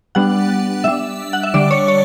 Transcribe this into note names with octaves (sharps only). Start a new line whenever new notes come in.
G3 B3 D4 F#5
G3 D4 E5
F#5
E5
D3 G3 D4 D5
C#5
C#5